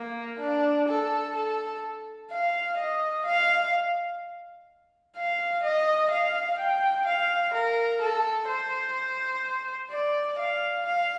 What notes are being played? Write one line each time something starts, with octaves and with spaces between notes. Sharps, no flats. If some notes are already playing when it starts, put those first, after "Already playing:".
Already playing: A#3
D4
A4
A4
F5
D#5
F5
F5
D#5
F5
G5
F5
A#4
A4
C5
D5
F5
F5